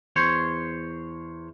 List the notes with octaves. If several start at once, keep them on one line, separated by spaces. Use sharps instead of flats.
E2 C5 C#5